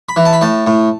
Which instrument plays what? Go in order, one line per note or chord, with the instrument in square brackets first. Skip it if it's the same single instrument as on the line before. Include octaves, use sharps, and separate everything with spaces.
[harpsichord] B5
E3
A5
B5
A2 A5
A2